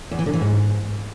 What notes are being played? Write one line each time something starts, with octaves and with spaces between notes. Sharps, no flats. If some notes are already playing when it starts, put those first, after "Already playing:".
E2
E3
D3
E3
G#2